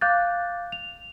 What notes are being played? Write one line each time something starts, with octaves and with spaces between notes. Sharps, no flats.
F5 D6 F#6 G6 A6
F7